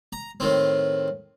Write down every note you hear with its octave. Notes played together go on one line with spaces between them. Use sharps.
A#5
A2 D#3 C4